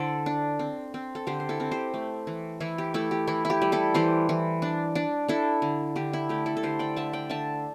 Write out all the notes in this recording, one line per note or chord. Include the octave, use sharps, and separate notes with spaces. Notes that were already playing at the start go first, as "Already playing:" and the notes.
Already playing: D3 E4 A4 C5 D5
D4
C4
C4
A4
D3 G4 C5
C5
E4 A4
C4
G4 C5
A3
E3
E3 E4
G4
A3 E4 A4
G4
E3 E4
E4
G4
G3
E4 A4
E3 G4 C5
E3
D4
D4
D4 E4 A4
D3
D3 G4
E4
A3 G4
E4 A4
A4
D3 G4 C5
D5 G5
D3 E5 A5
D5 G5
D3 E5 A5